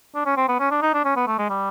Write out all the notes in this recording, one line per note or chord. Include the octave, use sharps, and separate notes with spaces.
D4
C#4
C4
B3
C#4
D4
D#4
D4
C#4
B3
A3
G#3
G3